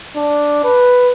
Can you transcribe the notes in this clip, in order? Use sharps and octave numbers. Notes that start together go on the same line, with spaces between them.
D4
B4